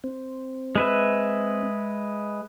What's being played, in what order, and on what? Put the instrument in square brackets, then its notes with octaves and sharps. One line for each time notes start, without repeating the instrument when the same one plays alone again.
[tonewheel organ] C4
[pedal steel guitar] G#3 B4 E5